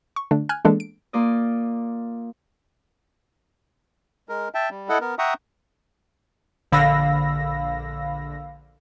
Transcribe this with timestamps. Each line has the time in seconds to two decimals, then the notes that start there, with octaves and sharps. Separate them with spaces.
0.16 C#6
0.31 D3 A3 D4
0.49 G#5 F6 F#6 G#6
0.65 E3 G#3 A#3 B3 D4 A4
0.80 D7
1.13 A#3 F4 D5 D#5
4.29 G#3 A#4
4.55 E5 G5 A5
4.70 G3
4.89 E4 A4 D#5 F#5
5.01 B3 A#4
5.19 E5 F#5 G5 A#5 C#6 D#6
6.72 A#1 D3 F5 B5 E6 A#6